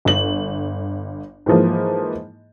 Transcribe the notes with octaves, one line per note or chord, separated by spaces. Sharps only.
G1 F#7
G#2 E3 F3 A#3